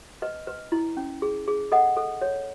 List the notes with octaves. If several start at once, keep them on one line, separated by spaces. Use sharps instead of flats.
B4 D#5
B4
E4
C#4
G#4
G#4
A4 D#5 F#5
A4
C#5